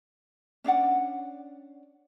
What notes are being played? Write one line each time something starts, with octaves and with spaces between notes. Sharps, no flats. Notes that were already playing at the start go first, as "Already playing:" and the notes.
C#4 D4 D5 F#5